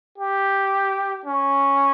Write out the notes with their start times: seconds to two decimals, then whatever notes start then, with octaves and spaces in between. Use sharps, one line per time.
0.18 G4
1.25 C#4